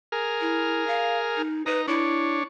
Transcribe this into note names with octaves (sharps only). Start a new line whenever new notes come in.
G#4 A#4 F6
E4
F5
D#4
D#4 B4 A#5
D4 E4 C#5